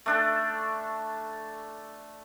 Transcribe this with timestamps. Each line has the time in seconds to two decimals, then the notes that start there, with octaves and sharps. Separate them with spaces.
0.06 A3 D4 A4